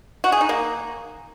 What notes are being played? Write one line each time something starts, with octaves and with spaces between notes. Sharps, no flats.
F#4
G#4
D#4
A#3